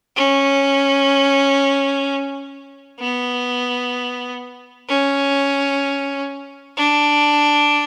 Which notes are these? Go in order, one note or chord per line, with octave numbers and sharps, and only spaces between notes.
C#4
B3
C#4
D4